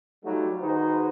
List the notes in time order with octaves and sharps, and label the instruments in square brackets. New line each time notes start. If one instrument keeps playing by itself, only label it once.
[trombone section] F#3 G3 A3 D#4 F4 F#4
D#3 D#4 F#4 G#4 B4 C5